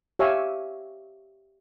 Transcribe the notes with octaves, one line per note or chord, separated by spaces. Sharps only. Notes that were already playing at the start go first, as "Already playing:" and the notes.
G4 C#5 E5 F5 G#5